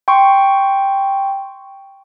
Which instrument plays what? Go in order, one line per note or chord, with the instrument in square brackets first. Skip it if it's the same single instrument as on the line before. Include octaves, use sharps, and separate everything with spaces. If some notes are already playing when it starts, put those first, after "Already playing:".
[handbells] G5 C6 C#6